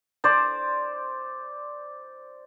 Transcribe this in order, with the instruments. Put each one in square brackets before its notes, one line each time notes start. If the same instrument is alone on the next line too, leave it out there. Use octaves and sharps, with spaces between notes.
[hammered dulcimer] C5 D5